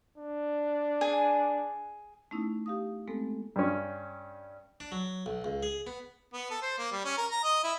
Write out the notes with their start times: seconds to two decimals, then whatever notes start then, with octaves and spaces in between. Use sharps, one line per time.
0.18 D4
1.01 G#4 G#5
2.31 A3 B3 C#4 D#4 E4
2.66 G4 F5 D#6
3.08 G#3 A3 B3 C4 A4
3.56 G2 C#4
4.80 D4
4.92 F#3
5.26 B1
5.44 C#2
5.63 G#4
5.87 B3
6.33 B3
6.51 A4
6.62 C5
6.78 A#3
6.92 G3
7.05 C#4
7.18 A#4
7.31 A#5
7.44 D#5
7.64 E4